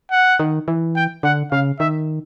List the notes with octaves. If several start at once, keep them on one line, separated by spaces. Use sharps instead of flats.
F#5
D#3
E3
G5
D3 F#5
C#3 F5
D#3 E5